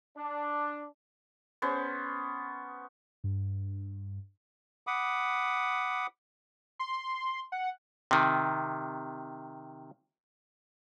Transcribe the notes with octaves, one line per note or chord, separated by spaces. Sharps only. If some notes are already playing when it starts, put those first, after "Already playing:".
D4
B3 C#4 C5 C#6
G2
F#5 B5 D6 D#6
C6
F#5
C3 D#3